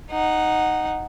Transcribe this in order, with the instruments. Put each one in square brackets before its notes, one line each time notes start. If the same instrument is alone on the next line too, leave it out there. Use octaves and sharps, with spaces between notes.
[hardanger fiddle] D#4 F#5